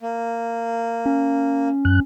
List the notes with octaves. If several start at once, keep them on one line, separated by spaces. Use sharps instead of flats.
A#3
C#4
F#2 F#6